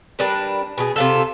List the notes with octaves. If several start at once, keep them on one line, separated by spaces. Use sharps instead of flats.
G3 D4 A#4 B4
B2 G#4
C3 F4 A4